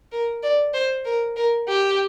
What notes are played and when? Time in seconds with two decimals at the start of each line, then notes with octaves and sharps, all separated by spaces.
0.12 A#4
0.43 D5
0.74 C5
1.05 A#4
1.36 A#4
1.68 G4